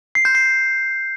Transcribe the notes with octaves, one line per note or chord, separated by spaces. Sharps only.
C7
G6
C7